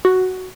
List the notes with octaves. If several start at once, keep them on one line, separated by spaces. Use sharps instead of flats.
F#4